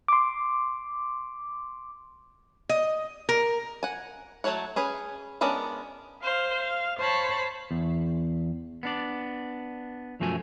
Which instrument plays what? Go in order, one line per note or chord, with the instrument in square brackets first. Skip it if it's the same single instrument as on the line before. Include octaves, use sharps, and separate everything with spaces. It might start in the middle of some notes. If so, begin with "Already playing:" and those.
[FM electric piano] C6 D6
[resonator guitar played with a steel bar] D#5
A#4
[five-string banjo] F#5 G#5
F#3 A3 F#4 C#5 F#5
C#4 G#4 B4
G#3 B3 C#4 D4 A#4
[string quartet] C5 F5
F5
C5 C#5 A5 B5
[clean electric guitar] E2
B3 D4 D5
B1 F#2 F3 A3 F#4 G#5